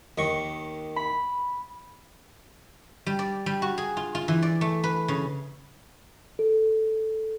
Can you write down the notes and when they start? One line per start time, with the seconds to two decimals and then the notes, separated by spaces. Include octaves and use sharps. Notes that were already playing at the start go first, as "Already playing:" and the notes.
0.18 D#2 D#3 C#6
0.96 B5
3.06 G3
3.19 D5
3.46 G3
3.62 F#4
3.78 G#4
3.97 F4
4.15 F4
4.28 E3
4.42 D5
4.61 A3
4.84 B4
5.08 C#3
6.39 A4